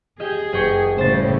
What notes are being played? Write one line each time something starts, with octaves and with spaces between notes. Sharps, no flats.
G4 G#4 D#5
F#1 G5 C#6
A2 C#3 G3 C5 A6